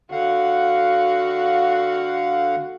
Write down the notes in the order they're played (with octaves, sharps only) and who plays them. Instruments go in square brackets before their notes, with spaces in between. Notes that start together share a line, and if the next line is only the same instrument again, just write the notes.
[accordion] D3 F5 F#5 [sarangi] F#4